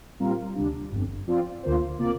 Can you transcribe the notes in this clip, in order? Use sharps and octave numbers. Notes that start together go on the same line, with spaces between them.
A#2 G3 C4 F4 A#4
D2 C3 G3 D4
G1 F2 D3 G3
F3 C4 F4 D5
D2 D3 A#3 F4 C5
C3 A#3 F4 D5